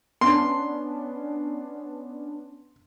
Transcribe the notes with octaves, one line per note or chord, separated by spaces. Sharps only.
B3 C#4 D4 C6